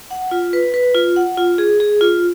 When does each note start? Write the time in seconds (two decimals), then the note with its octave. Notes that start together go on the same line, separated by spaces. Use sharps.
0.11 F#5
0.31 F4
0.53 B4
0.74 B4
0.95 F4
1.16 F#5
1.38 F4
1.58 G#4
1.80 G#4
2.01 F4